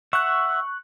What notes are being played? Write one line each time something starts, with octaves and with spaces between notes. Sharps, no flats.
E5 F#5 C#6 F#6